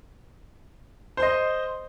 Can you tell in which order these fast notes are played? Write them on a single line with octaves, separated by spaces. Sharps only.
C5 C6 D#5